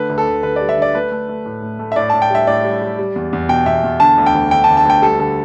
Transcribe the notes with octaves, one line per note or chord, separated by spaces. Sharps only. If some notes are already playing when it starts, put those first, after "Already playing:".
Already playing: D3 A3 B4
D2
A4
D2
D3 B4
G3 D5
E5
D3 D5
A3 B4
A3
A3
A2
A2
A3
E5
A2 D5
A2 A5
G5
G3 E5
A2 D5
G3
G3
G3
E2
E2
B2 G5
E2 E5
E2
D3 A5
D2
G5
D2
D3 G5
A5
D2
A5
D2 G5
G3 A4
D3 A4